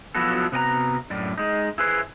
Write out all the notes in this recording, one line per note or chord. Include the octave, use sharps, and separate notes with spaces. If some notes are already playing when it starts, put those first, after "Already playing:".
F3 F#3 B3 E4 F#4 A4
C3 B3 F#4 G#5 A#5
F#2 A2 D5
G#3 D#4
E4 G#4 B4 C5